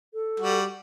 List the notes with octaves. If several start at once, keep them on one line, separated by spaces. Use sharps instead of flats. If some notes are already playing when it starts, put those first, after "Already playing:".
A4
G3 F#4